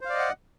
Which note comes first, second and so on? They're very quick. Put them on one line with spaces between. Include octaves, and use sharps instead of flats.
C5 F5 D5 D#5 F#5